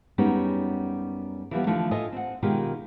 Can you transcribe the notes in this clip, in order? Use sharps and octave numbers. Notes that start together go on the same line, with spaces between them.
F#2 G3 G#3 B3 C#4 D#4
E3 F3 G3 B3
D3 E3 F3 A3 D4
A2 F4 A4 D#5 E5 G#5
C4 F#5
B2 D#3 G#3 F4 G4